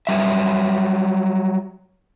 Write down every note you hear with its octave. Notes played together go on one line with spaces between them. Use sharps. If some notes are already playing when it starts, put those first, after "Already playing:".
F#3 G3 E5